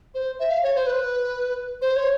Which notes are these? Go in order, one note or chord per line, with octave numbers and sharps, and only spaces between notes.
C5
E5
F5
C#5
C5
B4
C5
C#5